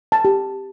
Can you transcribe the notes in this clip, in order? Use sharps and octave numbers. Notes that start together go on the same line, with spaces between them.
A5
G4